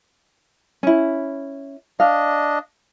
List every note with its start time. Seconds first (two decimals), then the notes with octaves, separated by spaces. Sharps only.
0.83 C#4 E4
2.00 D4 D#5 F5